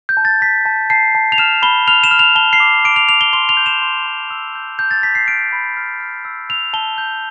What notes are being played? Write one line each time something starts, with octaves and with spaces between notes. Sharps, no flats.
G6
A5
A6
A5 B6
A5
A5 C7
A5
F7
F6 E7
B5 G7
F6 F7
E7
F6
F7
A5 G7
C7
D6
D6 D7
F7
D6 F7
G7
C6 G7
F7
G6
E7
C6
C6
E6
G6
A5 G6
A6
A5 B6
C7
F6 D7
B5
F6
F6
E6
E6 F7
A5 G7
G6